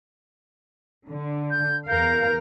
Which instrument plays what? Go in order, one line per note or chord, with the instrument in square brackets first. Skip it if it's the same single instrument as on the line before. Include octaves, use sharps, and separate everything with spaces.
[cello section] D3
[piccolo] G6
[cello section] E2 A#4 F5 [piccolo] G6